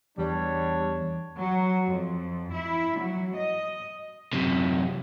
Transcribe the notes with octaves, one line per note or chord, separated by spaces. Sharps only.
E2 G3 D4 C#5
F#3
F2
E4
F#3
D#5
F#2 C3